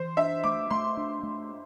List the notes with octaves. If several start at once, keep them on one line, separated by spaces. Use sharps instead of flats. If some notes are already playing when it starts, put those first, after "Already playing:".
Already playing: E3 C5
D4 E5
A3 D6
A3 C6
D4
A3